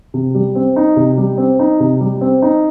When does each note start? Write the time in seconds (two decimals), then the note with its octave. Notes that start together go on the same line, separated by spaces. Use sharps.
0.14 C3
0.35 G3
0.55 C4
0.76 D#4
0.96 C3
1.18 G3
1.38 C4
1.59 D#4
1.80 C3
2.01 G3
2.21 C4
2.42 D#4